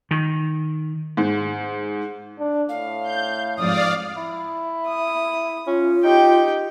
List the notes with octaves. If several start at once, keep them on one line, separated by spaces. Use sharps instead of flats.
D#3
G#2
D4
A2 F5
G6
F2 G#2 D5 F5 D#6
E4
D#6
C#4 F4
D#4 G4 G5